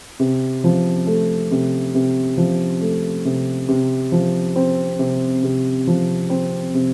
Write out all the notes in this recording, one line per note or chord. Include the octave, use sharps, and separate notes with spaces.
C3
F3
A3
C3
C3
F3
A3
C3
C3
F3
C4
C3
C3
F3
C4
C3